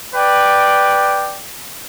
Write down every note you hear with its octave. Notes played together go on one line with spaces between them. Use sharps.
B4 D5 G5